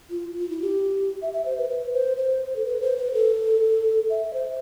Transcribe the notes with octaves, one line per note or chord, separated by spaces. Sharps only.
F4
F4
E4
G4
E5
E5
C5
B4
B4
C5
C5
A4
B4
C5
B4
A4
E5
C5